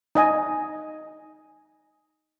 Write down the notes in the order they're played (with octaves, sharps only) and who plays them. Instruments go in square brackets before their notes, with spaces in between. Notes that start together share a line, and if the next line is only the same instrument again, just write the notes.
[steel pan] D#4 D#5 G#5